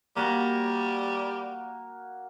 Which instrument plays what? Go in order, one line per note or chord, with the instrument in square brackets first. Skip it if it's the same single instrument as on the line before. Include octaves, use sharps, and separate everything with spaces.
[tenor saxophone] G3 [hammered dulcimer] A#3 F#4